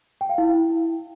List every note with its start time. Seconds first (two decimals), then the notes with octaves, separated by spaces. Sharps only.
0.21 G5
0.29 F5
0.38 E4